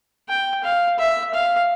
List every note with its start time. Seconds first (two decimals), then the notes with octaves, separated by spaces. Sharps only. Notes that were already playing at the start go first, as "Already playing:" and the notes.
0.29 G5
0.64 F5
0.99 E5
1.34 F5